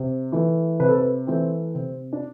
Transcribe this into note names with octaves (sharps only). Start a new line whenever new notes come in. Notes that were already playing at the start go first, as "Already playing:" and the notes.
Already playing: C3
E3 A3
C3 B4
A4
B4
E3 A3 C4
C3 C4
D4